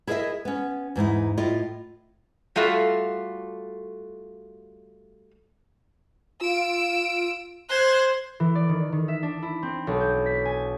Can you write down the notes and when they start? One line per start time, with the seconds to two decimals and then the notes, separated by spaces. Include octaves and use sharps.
0.07 E4 G#4 A#4 C#5 D#5 E5
0.45 B3 C#4
0.95 E2 G#2 D#4 E4
1.37 A2 E4 F4 D#5
2.56 G3 A3 F4 F#4 A4
6.41 F4 E6 D7
7.69 C5 C6 F#6 G#6
8.40 E3
8.55 D5
8.69 D#3
8.92 D#3
9.08 E5
9.23 D4
9.42 E4
9.63 C4
9.87 B1
10.01 G6
10.26 B6
10.45 G#5